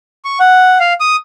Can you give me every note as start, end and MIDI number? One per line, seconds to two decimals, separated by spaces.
0.25 0.39 85
0.40 0.78 78
0.80 0.93 77
1.00 1.16 87